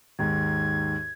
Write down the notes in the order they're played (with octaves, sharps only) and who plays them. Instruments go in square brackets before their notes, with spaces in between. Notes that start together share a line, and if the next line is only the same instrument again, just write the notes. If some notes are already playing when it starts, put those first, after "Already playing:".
[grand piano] D#2 G#2 [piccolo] G#6